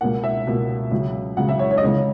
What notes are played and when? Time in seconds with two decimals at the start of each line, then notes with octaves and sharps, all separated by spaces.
0.01 C#2 B2 A#3 F#5
0.24 E5
0.47 C#2 B2 A#3
0.91 C#2 C#3 F#3
1.37 C#2 C#3 F#3 F#5
1.49 E5
1.59 C#5
1.71 C#5
1.78 D#5
1.82 C#2 C#3 E3 G#3 C#5